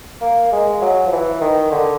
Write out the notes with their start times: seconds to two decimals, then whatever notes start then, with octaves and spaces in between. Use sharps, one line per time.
0.21 A#3
0.52 G#3
0.81 F#3
1.06 F3
1.12 E3
1.41 D#3
1.72 D3